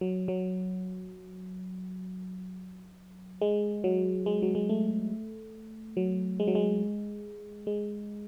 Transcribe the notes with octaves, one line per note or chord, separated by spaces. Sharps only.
F#3
F#3
G#3
F#3
G#3
F#3
G#3
A3
F#3
G#3
F#3
G#3
G#3